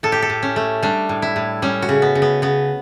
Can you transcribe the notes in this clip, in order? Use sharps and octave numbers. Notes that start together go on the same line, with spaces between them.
A2 A4
G4
A4
A2
C#4
A3
G3 D4
A2
E4
A2
G3 C#4
F#4
C#3
B3
C#3
B3
C#3 B3